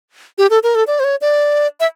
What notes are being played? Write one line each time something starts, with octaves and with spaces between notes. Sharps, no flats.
G4
A4
A#4
A4
D5
C5
C#5
D5
E5